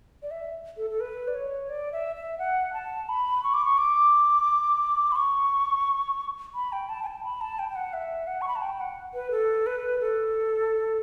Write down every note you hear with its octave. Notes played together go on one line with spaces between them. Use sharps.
D5
E5
A4
A4
B4
D5
C#5
D5
E5
E5
F#5
A5
B5
C#6
D6
C#6
D6
B5
C#6
B5
G5
A5
G5
A5
B5
A5
G5
G5
F#5
E5
F#5
C#6
B5
A5
G5
F#5
B4
A4
B4
A4